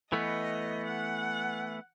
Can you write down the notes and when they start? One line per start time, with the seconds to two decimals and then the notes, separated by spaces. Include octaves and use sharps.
0.12 E3 A3 B3 D#5
0.86 F#5